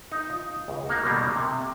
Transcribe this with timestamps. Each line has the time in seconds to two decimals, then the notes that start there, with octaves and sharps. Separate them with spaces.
0.11 D#4
0.30 F4
0.68 C#2
0.86 A#3 D#4 F#4
1.04 B2 D3 D#3 G3 A#3
1.36 C3